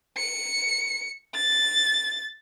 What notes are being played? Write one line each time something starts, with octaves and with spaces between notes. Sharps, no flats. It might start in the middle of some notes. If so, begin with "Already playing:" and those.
C#7
A6